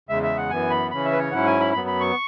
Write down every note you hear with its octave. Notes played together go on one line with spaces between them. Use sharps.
E2 C#3 G#3 E5
E5
F#5
F#2 E3 B3 G#5
B5
C#3 E3 C#4 B5
E5
B4
C#5
G#2 F#3 C#4 E4 F#5
G#5
B5
F#2 F#3 B3 B5
B5
C#6